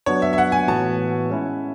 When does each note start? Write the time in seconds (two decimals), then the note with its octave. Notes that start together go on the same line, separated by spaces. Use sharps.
0.06 F#3 B3 D4 C#5
0.22 E5
0.33 E5
0.38 F#5
0.52 G#5
0.68 A2 E3 B3 F#4 A5
1.29 G#3 C#4 E4